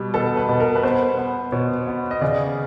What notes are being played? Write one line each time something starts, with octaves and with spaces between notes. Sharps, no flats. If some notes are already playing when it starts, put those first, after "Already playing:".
Already playing: B2 G3
B2 A4
B4
B2
A#4
B4
B3 C5
B3
B2 C#5
B3
D#5
C#3 D5